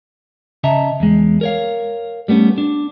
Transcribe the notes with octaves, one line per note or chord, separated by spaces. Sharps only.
C#3 D#5 E5 A5 A#5
E2 G#3
A#4 C#5 F5
G3 A3 B3 C#4
D4